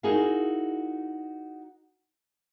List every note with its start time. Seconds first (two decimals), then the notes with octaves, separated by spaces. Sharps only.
0.03 D#4 E4 F#4 G#4 A#4 F5